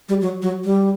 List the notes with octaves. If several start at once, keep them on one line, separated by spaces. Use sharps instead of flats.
G3
F#3
F#3
G3